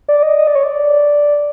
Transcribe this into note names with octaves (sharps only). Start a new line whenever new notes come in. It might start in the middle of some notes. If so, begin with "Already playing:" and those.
D5
D#5
D#5
D5
C#5
D5